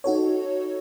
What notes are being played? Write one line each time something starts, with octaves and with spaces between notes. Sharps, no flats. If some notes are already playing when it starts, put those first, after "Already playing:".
D#4 F#4 A4 C#5